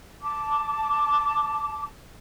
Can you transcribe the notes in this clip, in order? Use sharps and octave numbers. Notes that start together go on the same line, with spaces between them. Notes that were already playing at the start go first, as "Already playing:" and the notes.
A5 D6